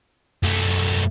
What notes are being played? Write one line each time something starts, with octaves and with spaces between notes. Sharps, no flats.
F#2 A3